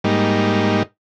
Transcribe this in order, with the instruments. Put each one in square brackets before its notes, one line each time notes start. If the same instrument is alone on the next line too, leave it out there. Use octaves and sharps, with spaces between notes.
[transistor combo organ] G#2 G3 A#3 D#4